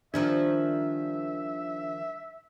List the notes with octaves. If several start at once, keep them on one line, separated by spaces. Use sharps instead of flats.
D#3 F3 G3 D4 E5